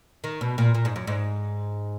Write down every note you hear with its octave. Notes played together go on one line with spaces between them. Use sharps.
D#3
B2
A#2
A#2
G#2
F#2
G#2